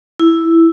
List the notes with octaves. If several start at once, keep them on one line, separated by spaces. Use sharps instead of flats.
E4